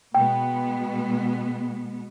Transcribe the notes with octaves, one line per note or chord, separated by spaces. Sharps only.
B2 G#3 B3 G5